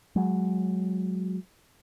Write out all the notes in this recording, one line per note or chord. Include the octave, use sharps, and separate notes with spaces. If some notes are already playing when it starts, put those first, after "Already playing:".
F#3 G#3